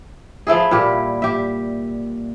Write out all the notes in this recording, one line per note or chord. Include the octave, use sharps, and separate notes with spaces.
F3 A3 E4 G#4
A#2 G3 G4
G4 E5